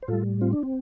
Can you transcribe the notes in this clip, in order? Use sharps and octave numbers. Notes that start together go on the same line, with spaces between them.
C5
A2 G3 F4 A4
C4 F4
D4
C4